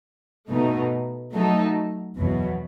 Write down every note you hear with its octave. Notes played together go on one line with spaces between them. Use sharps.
B2 A3 D#4
F#3 A3 D#4 A4
E2 B2 F#3